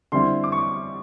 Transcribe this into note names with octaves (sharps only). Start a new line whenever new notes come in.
D3 G3 C4 E4 C6
D6
C#6